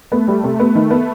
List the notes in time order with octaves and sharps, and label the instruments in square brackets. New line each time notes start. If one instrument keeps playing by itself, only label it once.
[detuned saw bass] A3 [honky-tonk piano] B3
[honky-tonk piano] G3
C3
B3
D#3
B3